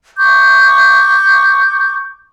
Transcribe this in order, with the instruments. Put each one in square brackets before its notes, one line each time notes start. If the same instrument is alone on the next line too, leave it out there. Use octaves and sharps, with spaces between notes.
[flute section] C#6 D6 G6